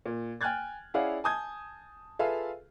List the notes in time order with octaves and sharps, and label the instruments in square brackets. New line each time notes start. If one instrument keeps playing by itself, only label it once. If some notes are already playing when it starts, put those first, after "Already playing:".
[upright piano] A#2
G5 G#5 F6 F#6 G#6 A6
C#4 E4 G#4 D5 F5 F#5
G#5 A5 D#6 G6 G#6
F4 G#4 A4 B4 E5 F5